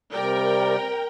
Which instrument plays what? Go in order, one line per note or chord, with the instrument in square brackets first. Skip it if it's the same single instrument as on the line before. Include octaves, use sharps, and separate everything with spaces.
[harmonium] C3 G3 D5 [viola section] A#4 G5